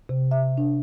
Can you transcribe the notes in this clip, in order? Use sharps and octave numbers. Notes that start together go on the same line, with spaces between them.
C3
E5
D4